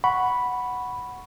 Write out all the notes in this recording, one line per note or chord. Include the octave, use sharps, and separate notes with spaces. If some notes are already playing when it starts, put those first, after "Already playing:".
F#5 B5 C#6